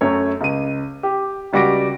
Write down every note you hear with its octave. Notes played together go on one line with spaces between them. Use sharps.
F#2 A3 C#5 E5
C#2 D#7
G4
C#2 G3 F#4 D6 A#6 D7